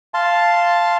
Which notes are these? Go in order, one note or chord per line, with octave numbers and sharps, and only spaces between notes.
F5 A5 C6